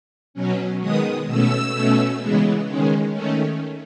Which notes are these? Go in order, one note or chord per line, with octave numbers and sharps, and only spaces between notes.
B2 F#3 C#4
D#3 G#3 B3 D#6
B2 A3 C#4 E6
B2 A3 C#4
C#3 E3 G#3 B3
D#3 G#3 C#4
D#3 A3 C#4